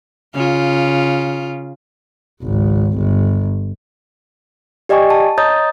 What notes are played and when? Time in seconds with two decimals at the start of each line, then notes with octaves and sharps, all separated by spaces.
0.35 C#3 F4
2.43 G#1 C#2
2.97 G1
4.89 G4 D5 D#5 G5 G#5 C#6
5.10 A5
5.38 C#5 D#5 A#5 D#6 G6 A6